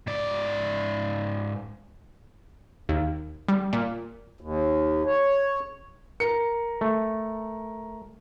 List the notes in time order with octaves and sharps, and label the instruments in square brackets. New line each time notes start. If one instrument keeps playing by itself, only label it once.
[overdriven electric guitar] G#2 D5
[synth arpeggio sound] D#2
G3
A#2
[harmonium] D#2
C#5
[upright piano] A#4 C#7
[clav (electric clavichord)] A3